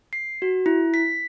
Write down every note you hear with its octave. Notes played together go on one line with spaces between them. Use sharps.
C7
F#4
E4
B6